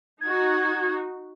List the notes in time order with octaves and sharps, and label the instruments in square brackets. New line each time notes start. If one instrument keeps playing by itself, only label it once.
[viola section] D#4 F#4 [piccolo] G#6